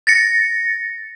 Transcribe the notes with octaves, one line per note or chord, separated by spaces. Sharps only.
A6 A#6 C#7